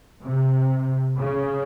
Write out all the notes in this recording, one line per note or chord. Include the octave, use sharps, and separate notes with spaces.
C3
C#3